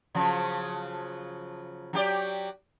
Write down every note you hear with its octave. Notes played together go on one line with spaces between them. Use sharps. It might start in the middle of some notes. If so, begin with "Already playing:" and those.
C#3 F3 F#3
F#3 G4 D5